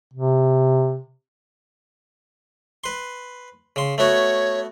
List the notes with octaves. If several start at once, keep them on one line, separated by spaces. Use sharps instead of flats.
C3
B4 C6
C#3 C6
A3 B3 F#4 C#5